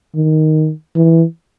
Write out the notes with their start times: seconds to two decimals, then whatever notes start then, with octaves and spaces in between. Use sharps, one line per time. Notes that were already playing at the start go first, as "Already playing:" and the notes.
0.15 D#3
0.95 E3